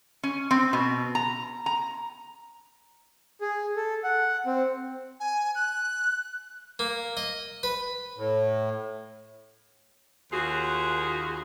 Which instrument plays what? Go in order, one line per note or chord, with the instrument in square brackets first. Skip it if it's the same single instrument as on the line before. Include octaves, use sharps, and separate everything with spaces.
[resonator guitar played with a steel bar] C#4
C4
B2
A#5
A#5
[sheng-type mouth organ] G#4
A4
F#5
C4
[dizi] G#5
F#6
[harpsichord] A#3
D#5
B4
[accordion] A2
[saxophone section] D#2 F4 F#4 G#4